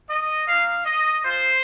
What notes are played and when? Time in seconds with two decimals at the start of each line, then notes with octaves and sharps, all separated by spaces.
0.10 D#5
0.47 A#3 D#4 F5
0.85 D#5
1.24 G#3 F4 C5